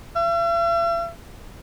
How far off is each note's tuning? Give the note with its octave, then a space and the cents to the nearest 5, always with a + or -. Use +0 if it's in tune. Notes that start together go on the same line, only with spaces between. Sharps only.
E5 +45